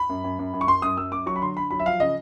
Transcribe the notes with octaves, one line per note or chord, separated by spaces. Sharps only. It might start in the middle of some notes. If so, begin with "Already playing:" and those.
Already playing: B5
F#2
F#2
F#2
F#2
C#6
F#2 C6
F#2 D#6
F#2 E6
F#2 D6
F#3 C#6
B5
D3 C6
D3 B5
F#3 B5
E5
F3 F5
C#3 D#5